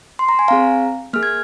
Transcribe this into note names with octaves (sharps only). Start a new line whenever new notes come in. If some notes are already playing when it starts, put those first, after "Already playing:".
C6
A#5
G#5
C4 G#4 F5 A#5
A#3 G#4 F6
G#6